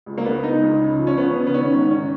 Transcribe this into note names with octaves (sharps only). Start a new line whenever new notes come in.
C#2
A#3
C#2 B3
C#2 D#4
C#2
C#3
F3
C#4
F3 B3
C#3
B3
D#3 C#4
G#2
D#3 C#4